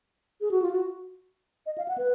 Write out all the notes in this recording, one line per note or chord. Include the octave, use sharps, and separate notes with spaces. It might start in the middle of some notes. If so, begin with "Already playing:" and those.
G#4
F#4
F4
F#4
D#5
F5
F#5
B4